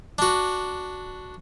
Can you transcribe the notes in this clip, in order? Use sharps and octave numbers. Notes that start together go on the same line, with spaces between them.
D4 F#4